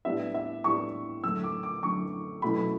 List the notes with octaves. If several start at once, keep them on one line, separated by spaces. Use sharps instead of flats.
A2 G3 B3 D4 E5
E5
A2 G3 B3 D4 C#6
F#2 D3 A3 E6
D6
D6
F#2 D3 A3 C#6
B2 F#3 A3 C#4 E4 B5